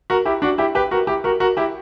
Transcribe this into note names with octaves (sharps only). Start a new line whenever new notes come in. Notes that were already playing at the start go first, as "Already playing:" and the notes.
F#4 A#4
E4 G4
D4 F#4
E4 G4
G4 B4
F#4 A#4
E4 G4
F#4 A#4
F#4 A#4
E4 G4